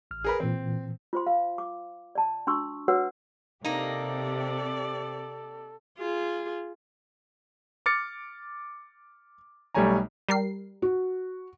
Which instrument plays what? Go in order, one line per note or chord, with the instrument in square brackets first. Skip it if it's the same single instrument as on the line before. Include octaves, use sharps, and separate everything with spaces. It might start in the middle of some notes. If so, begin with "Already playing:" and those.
[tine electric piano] A1 F6
[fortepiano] G#4 A#4 B4
[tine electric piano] A#2 E3 [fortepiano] C4
[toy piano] F4 C5 C6
F5
D6
D5 A5
D4 F#4 C6 C#6 E6
F#4 B4 C#5 F#5 E6
[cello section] C3 [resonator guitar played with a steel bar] A#3 D#4 [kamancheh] G4 D5 [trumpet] A4
[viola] F4 G#4
[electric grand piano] D6 F6 A6 C#7
B1 G3 A3 C#5 G#5 A#5
[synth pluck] G3 A#4 C7
[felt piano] F#4